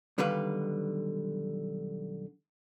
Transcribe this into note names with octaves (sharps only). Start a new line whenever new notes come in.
B1 D3 D#3 G3 B4 F5